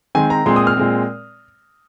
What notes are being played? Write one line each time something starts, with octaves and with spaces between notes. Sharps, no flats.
D#3 G#3 C4 G#5
A#5
A#2 G#3 C4 C6
D#6
F6
A#2 G#3 C4